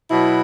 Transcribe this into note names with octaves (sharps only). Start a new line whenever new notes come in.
B2 F#3 E4